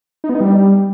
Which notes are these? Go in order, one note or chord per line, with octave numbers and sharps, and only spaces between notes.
D#4
B3
D#4
G3